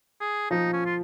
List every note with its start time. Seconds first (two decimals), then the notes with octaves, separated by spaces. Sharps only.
0.21 G#4
0.51 F3 D#4
0.73 C#4
0.86 F4